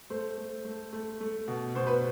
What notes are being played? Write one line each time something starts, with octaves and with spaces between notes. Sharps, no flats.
A3 C5
A3
A3
A3
A3
B2
B2 C5
B4